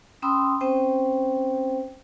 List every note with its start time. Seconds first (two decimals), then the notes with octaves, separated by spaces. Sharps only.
0.22 C#4 G5 B5 C6 D#6 E6
0.61 C4 C#4 C5 G5